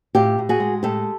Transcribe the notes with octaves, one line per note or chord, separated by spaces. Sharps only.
A2 F4 G4
A2
F#4 G#4
G#3
A2 G4 A4